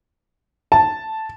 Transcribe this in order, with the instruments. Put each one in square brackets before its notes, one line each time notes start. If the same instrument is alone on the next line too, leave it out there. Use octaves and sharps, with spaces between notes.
[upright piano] A5